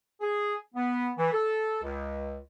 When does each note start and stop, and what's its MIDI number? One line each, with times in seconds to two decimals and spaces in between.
0.21 0.54 68
0.75 1.11 59
1.17 1.31 52
1.32 1.78 69
1.82 2.36 37